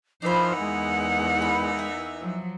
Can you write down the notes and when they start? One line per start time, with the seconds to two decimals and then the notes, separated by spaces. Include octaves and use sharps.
0.22 E3 F3 A#3 D#4 C5 D5 B5
0.59 E2 G#3 F#5
1.42 B5
1.79 E5
2.19 F3 F#3